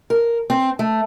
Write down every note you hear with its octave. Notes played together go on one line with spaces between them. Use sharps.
A#4
C4
A3